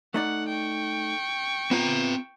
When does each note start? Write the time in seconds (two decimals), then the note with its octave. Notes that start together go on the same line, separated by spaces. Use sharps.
0.14 A3 D#4 D5 F#5
0.49 G5 C#6
1.71 B3 C4 F4 A#5